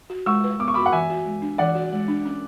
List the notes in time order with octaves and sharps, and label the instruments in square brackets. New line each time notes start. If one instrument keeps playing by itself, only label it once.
[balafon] F#4
[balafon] G#3 [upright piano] C#6 E6
[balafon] B4
[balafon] B3 [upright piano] D6
[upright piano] C#6
[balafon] F#4 [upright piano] B5 D6
[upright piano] F#5
[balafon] E3 [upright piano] E5 G#5
[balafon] F#4
G#3
D4
[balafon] E3 [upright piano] D5 F#5
[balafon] F#4
G#3
D4
C#4